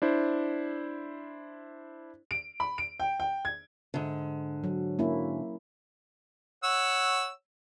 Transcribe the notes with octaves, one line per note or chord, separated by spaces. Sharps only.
D4 E4 C5
D7
B5
D7
G5
G5
G#6
G#2 D3
F#3
A#3 C#4 E4
C#5 F#5 E6